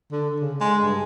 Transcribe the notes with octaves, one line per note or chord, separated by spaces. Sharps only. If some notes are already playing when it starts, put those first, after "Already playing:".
D3
C#3
G#3
G2